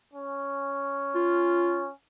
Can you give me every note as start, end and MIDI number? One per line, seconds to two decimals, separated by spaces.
0.13 1.91 61
1.15 1.85 65